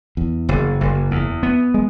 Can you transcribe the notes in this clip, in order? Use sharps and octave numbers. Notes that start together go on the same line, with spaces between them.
E2
F#1
F#1
E2
B3
G#3